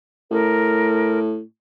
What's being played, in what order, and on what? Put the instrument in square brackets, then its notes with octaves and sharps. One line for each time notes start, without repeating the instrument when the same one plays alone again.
[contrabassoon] A2 [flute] A#4